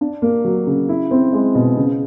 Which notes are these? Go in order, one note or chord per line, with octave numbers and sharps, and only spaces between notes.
D4
A#3
F#3
C#3
E4
C4
G#3
B2
C#3